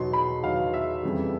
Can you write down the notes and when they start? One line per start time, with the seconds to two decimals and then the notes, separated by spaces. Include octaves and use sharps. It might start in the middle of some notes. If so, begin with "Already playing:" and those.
Already playing: E2 B2 F#3 B3 D#4 C6
0.13 B5
0.42 E2 B2 F#3 B3 D#4 F5
0.73 E5
1.03 F2 C#3 E3 G3